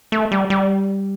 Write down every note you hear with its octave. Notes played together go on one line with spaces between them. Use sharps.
A3
G3
G3